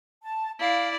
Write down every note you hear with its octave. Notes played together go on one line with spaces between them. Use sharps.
A5
E4 D5 F5